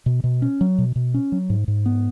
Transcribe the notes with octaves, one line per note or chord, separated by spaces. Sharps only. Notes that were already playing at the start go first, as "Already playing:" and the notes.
B2
B2
C#4
F#3
B2
B2
C#4
F#3
G#2
G#2
B3